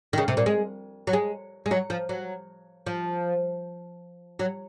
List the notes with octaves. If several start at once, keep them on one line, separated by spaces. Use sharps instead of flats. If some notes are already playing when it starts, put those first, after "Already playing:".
D#3
C#3
C3
A#2
G#3
F#3
G#3
G#3
F#3
F3
F#3
F3
F#3